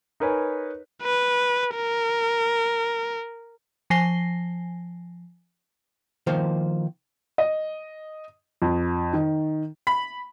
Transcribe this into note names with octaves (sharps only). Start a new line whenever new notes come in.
D#4 A#4 B4 C#5 G#5
B4
A#4
F3 G#5 A#6 C7 G7
D#3 F3 A#3 C5
D#5
F2
D#3
B5